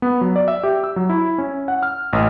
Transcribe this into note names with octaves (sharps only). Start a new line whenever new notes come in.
B3
F#3
D5
E5
G4
E6
F#3
E4
C#4
F#5
F6
A1